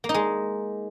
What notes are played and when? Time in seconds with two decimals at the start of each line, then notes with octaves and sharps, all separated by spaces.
0.04 A#3
0.09 D#4
0.14 G#3